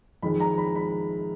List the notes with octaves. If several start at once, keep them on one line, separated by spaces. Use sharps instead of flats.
F2 D#3 G#3 B5
A#5
B5
B5